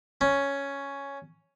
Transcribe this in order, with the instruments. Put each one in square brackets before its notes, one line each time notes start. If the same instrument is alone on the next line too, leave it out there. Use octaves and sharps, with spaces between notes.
[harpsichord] C#4